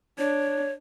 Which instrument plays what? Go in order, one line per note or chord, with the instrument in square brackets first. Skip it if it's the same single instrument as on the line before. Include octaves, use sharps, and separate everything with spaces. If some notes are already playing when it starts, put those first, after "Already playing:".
[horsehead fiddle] D4 [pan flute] C#5